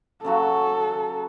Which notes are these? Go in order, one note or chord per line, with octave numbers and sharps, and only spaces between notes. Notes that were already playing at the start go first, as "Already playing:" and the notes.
C#3 F#3 F#4 A4